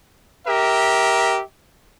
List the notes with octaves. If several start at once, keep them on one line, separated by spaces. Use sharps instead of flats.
G4 A#4 E5